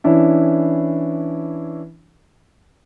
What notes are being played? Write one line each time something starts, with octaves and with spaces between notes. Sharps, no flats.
E3 C#4 D4 E4